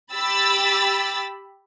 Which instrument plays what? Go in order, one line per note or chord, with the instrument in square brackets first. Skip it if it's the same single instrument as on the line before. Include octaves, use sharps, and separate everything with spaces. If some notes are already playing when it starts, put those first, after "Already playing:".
[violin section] G4 B5 E6 A6